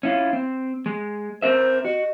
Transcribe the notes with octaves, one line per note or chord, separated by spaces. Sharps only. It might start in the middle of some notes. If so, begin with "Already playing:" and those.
C#4 E4 F4
C4
G#3
C4 A#4 C5 E5
F#4 D#5